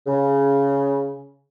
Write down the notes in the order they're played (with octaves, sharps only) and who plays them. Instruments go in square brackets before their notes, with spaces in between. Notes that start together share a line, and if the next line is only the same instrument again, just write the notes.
[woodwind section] C#3